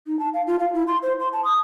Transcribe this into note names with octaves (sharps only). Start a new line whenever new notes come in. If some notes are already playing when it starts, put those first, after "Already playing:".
D#4
A5
F5
F4
F5
E4
C6
C5
C6
A5
D#6